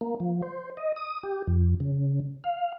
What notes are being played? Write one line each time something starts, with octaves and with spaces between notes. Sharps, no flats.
A#3
F3
C5
D#5
D#6
G4
F2
C#3
F5